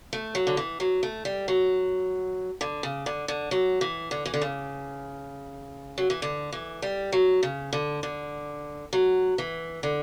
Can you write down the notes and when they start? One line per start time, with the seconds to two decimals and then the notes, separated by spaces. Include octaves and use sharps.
0.13 A3
0.35 F#3
0.47 D3
0.57 E3
0.80 F#3
1.03 A3
1.25 G3
1.48 F#3
2.61 D3
2.83 C#3
3.06 D3
3.28 D3
3.51 F#3
3.81 E3
4.11 D3
4.26 E3
4.34 D3
4.41 C#3
5.98 F#3
6.10 E3
6.22 D3
6.52 E3
6.82 G3
7.12 F#3
7.43 C#3
7.73 D3
8.03 D3
8.93 F#3
9.38 E3
9.83 D3